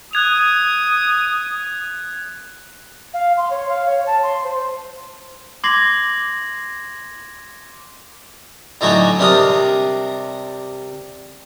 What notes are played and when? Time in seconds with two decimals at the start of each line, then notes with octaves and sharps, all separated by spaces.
0.13 D#6 F#6 G#6 F7
3.14 F5
3.37 C6
3.50 C#5
3.69 F5
3.86 C#5
4.07 A5
4.23 C6
4.44 C5
5.64 C6 D6 G#6 A#6 C7 F#7
8.81 A2 D3 F#3 D#4 C#5 G#5
9.19 C3 G3 D4 A#4 D#6